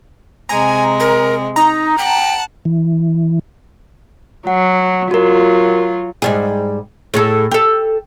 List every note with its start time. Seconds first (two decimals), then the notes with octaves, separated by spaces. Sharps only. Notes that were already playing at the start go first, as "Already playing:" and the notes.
0.49 C3 G#3 G#5 A#5
1.00 A#4
1.56 D#4 A#5
1.98 F#5 G5 A5
2.65 E3
4.47 F#3 F#5
5.11 F#3 F4 F#4 A#4
6.22 G#2 G3 G#4
7.14 A2 G#4 A4
7.51 G4 A4